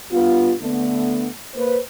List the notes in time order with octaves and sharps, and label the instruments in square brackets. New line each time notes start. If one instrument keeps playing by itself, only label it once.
[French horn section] G2 B3 F4
D3 A3 B3
A#3 B4 C5